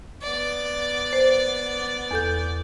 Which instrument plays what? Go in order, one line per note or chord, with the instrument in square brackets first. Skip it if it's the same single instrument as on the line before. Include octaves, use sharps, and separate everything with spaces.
[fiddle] B3 D5
[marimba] C5
E2 A4 G6